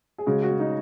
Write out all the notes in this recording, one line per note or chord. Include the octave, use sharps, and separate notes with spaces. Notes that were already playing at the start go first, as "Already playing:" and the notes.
G#4
C#3 G#3 F#4
F#4
D#4